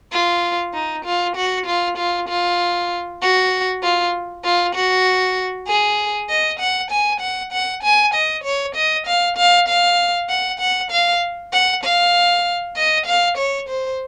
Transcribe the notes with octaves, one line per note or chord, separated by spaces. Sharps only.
F4
D#4
F4
F#4
F4
F4
F4
F#4
F4
F4
F#4
G#4
D#5
F#5
G#5
F#5
F#5
G#5
D#5
C#5
D#5
F5
F5
F5
F#5
F#5
F5
F#5
F5
D#5
F5
C#5
C5